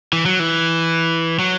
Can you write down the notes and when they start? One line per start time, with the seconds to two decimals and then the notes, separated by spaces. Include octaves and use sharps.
0.13 E3
0.26 F#3
0.39 E3
1.39 F#3